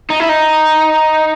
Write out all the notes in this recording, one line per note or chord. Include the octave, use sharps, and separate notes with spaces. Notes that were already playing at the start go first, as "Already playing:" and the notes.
D#4
E4
D#4